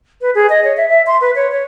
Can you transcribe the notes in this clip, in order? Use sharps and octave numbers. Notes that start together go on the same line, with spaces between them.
B4
G#4
D#5
C#5
E5
E5
C6
B4
C#5
C#5